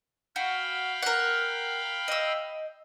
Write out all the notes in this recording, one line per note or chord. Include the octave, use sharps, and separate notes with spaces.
F#4 F5 G5 B5
A#4 F#5
D#5 E6